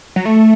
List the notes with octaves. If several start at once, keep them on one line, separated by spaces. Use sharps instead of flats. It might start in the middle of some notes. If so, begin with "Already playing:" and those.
F#3
A3